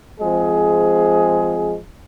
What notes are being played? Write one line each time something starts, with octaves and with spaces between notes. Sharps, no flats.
F3 G#3 C4 G#4